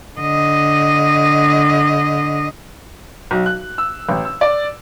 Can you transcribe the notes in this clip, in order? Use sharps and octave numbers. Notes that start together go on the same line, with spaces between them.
D3 D#5
B1
F#6
E6
A1
E6
D5